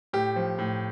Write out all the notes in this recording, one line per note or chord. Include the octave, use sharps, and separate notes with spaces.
A2 G4
F3
A2